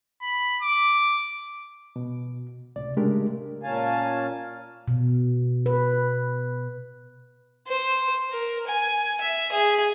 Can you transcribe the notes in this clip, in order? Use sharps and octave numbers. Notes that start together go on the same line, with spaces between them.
B5
D6
B2
C#2 A2 C3 D5
C#3 G#3 A3 D4 G4 A#4
A#2 A#3 C#4 F5 G#5 A5
B2
B4
C5
A#4
G#5
E5
G#4